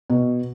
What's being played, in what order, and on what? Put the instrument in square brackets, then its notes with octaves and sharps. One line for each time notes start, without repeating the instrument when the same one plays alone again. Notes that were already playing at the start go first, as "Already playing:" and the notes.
[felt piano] B2